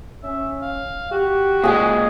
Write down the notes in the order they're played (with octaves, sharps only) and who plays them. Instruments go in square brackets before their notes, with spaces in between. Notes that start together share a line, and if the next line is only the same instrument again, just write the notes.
[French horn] C#4 [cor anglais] E5
[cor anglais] F5
[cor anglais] F#4 [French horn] G4
[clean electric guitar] A#2 G#3 [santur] G#4 G5 G#5